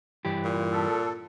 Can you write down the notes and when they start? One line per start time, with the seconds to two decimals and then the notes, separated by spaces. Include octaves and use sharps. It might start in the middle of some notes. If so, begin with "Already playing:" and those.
0.25 G2 E3 G4
0.44 A#2
0.71 A4